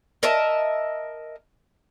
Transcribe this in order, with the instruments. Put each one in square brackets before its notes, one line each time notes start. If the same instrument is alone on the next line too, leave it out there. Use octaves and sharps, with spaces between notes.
[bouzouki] A#4 D#5 E5 A5